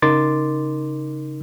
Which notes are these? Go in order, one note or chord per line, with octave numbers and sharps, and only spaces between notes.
C#3 D#4 A#4 C6 D6 A6